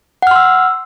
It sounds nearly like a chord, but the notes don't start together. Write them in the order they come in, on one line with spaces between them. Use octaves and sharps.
F#5 F6 C6 E6